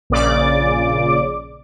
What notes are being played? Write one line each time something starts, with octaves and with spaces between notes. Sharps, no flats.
A#1 A#2 C#3 D5 D6